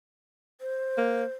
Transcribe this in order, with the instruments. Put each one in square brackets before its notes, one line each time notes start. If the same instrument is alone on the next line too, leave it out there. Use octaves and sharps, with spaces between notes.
[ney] C5
[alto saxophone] A#3